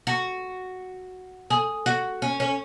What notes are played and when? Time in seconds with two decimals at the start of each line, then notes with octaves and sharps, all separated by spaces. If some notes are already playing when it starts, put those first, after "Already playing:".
0.07 F#4
1.50 G#4
1.86 F#4
2.22 C#4
2.40 C#4